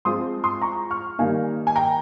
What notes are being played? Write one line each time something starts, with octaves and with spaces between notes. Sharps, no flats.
F3 G#3 C4 F4 C6 D#6
C6 D#6
A#5 C#6
C#6 F6
D#3 G3 A#3 D#4 F5 G#5
G#5
G5 A#5